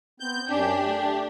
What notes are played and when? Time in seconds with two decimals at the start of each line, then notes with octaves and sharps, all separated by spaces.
0.20 B3 C4 G6
0.49 F#2 C#4 D4 G4
0.85 A3